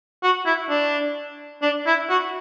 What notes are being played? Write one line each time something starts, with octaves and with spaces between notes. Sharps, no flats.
F#4
E4
D4
D4
E4
F#4